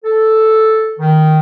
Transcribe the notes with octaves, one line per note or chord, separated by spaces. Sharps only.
A4
D#3